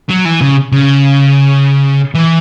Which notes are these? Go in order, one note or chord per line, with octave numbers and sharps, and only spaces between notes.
F#3
E3
C#3
C#3
E3